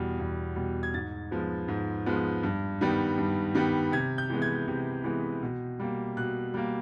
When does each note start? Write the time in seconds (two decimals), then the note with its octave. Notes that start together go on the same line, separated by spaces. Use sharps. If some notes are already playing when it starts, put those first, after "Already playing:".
Already playing: E2 B2 G3
0.19 E2
0.56 B2 G3
0.83 G#6
0.94 G#2 A6
1.31 F3 G#3 B3
1.68 G#2
2.06 F3 G#3 B3
2.43 G2
2.81 D#3 G3 B3
3.18 G2
3.55 D#3 G3 B3
3.92 C3 G#6
4.18 G6
4.30 E3 G#3 B3
4.42 G#6
4.67 C3
5.04 E3 G#3 B3
5.42 B2
5.80 G3 A#3
6.17 B2 F#6
6.54 G3 A#3